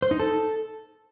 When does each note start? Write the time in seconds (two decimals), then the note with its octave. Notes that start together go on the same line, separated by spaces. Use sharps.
0.02 C5
0.11 D#4
0.20 A4